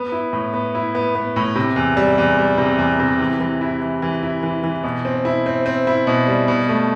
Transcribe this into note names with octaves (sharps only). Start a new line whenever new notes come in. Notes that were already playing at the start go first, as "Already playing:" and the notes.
Already playing: B3
E4
A2
B3
E4
B3
B3
A2
C3
E2
G3
E2
G3
C3
E2
C3
E3
E3
E4
E3
E3
E4
E3
E3
B2
C4
E4
C4
C4
E4
B2
G3
B2
A3